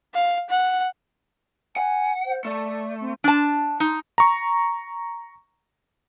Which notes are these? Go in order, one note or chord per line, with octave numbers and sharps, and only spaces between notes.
F5
F#5
F#5 G#5
C5
A3 D5
C4
D4 A5
D#4
A#5 C#6